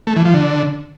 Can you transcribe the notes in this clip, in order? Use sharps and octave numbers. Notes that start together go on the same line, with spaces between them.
A3
E3
F3
D3